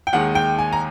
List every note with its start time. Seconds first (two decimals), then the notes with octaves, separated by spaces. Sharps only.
0.07 G5
0.13 D#2 D#3 G#3 F#5
0.35 G5
0.59 G#5
0.73 A#5